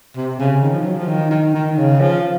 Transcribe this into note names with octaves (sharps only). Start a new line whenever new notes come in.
C3
C#3
D#3
F3
F#3
F3
D#3
D#3
D#3
C#3
F3